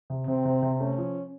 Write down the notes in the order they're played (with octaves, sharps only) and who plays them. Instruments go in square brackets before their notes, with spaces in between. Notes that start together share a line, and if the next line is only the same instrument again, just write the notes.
[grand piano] C3
[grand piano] C3 [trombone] C4
[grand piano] C3
C3
[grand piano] A3 [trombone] C#4
[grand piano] F3